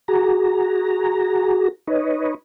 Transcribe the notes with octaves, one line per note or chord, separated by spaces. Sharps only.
F#4 G#4 A#5
D#4 B4 C#5 D#5